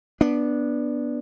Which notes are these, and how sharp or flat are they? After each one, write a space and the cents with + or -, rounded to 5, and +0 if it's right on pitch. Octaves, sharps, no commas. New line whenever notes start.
B3 -15 D4 +0